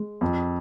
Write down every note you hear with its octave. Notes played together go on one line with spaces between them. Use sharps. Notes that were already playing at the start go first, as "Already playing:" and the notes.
Already playing: G#3
F2